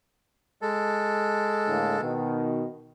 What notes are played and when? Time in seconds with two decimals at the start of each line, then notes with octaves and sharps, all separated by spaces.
0.62 G#3 A4
1.67 A2 D3 A#3
2.00 B2 D#3